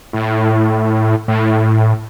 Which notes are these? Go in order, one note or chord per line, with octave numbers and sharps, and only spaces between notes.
A2
A2